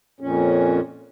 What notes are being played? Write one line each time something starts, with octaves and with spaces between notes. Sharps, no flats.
F2 A#2 C#4